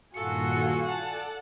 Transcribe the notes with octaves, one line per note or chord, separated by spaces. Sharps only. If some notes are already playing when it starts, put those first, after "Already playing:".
G2 A#2 D#3 F4 F#4 A4 G#5 C#7
A4 D5 F#5 A5